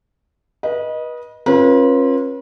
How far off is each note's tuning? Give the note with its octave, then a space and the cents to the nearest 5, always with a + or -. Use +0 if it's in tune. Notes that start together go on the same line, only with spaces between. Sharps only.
B4 -30 D#5 +0
C#4 -40 F4 +0 B4 -40